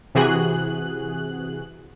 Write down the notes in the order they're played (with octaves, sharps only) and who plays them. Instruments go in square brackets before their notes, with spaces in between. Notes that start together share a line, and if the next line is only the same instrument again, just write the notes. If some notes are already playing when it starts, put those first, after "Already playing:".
[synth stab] C3 E3 F#4 G#4 F#6